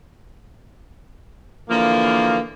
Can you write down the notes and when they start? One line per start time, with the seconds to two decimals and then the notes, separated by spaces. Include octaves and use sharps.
1.69 D3 E3 F3 A#3